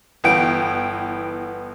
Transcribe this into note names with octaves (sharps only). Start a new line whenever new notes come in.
G1 E3 B3 G5 D7